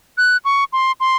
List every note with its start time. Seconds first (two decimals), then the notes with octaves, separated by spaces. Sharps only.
0.18 F#6
0.45 C#6
0.73 C6
1.00 C6